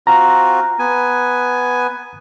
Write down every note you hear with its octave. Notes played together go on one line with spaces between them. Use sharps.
C4 F4 F#4 A#5
B3 G#5